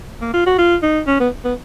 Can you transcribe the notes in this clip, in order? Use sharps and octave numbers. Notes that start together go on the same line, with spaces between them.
A#3
F4
F#4
F4
D#4
C#4
B3
B3